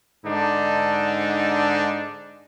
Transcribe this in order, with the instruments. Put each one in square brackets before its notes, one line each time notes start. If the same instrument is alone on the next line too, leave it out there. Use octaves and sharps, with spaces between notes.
[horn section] G#2 D3 D4 D#4